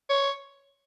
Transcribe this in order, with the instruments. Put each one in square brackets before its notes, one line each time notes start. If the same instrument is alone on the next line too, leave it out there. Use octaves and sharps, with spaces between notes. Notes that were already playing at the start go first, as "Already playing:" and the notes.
[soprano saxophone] C#5